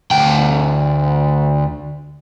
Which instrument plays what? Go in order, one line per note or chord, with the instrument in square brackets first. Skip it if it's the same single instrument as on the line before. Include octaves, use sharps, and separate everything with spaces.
[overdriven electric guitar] D2 G5